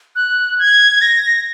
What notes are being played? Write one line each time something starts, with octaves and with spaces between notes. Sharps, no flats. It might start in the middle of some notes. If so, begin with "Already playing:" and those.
F#6
G#6
A#6